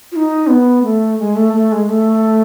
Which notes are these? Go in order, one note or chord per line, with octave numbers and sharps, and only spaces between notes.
F4
D#4
B3
A3
G#3
A3
A3
G#3
A3